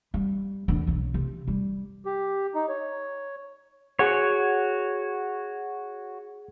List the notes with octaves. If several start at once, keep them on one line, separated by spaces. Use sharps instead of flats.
G3
E2 D3
B1 F#3
C3
G3
G4
D#4
C#5
F#4 G#4 C#5 F#5 G#6